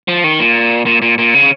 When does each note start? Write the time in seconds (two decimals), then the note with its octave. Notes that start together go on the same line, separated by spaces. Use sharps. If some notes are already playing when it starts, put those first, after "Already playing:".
0.08 F3
0.24 D#3
0.39 A#2
0.86 A#2
1.02 A#2
1.18 A#2
1.34 C#3